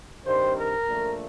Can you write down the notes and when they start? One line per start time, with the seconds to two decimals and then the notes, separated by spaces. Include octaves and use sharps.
0.25 G2 D#3 G3 C4 C5
0.56 A#4
0.87 A#1 A#2 A3